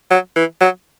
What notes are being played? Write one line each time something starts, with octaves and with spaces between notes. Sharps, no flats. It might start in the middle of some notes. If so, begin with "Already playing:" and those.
F#3
E3
F#3